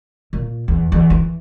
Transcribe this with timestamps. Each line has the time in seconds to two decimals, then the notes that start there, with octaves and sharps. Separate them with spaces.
0.33 A#2
0.68 E2
0.92 E2
1.10 E3